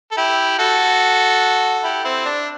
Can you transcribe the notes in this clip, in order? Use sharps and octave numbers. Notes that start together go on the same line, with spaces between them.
A4
E4 G4
F#4 A4
E4 G4
C4 E4
D4